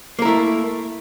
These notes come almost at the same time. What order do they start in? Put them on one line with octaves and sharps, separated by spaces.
A#3 A#4 E4 A3